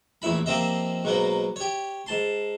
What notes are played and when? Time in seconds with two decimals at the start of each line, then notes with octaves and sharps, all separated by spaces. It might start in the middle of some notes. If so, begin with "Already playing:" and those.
0.22 A1 E2 A#2 E4 B5
0.46 F3 A#3 C4 G4 D#5 E5
1.04 G#2 B2 F#3 A#3 B3
1.56 G4 C#5
2.06 G#2 A5 C6